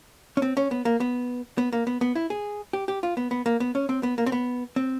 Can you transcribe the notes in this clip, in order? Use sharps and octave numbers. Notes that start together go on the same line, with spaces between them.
C#4
C4
C#4
B3
A#3
B3
B3
A#3
B3
B3
E4
G#4
G4
G4
F4
B3
B3
A#3
B3
C#4
C4
B3
A#3
C4
B3
C4